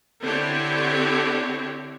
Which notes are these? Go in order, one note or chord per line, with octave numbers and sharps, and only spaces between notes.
D3 C4 D4 E4 G4 C#5